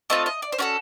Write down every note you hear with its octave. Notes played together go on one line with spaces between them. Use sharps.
A3 C4 F4 D#5
D#5
D5
C5
C#4 F#4 A4 C#5